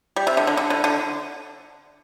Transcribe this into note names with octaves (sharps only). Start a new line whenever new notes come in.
G3
C3
D3
D3
D3
D3
D3